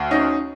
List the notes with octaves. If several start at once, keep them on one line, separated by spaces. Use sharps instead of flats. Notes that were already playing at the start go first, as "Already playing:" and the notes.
Already playing: D2
C#4 D#4